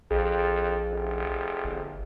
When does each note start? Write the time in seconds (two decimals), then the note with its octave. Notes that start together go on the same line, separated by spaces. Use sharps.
0.11 A#1 F2 G#4
0.91 F1
1.64 G1